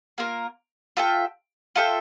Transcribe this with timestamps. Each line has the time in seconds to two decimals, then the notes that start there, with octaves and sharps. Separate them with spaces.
0.18 A#3 F4 A#4
0.97 F4 A4 E5 G5
1.76 F4 A4 E5 G5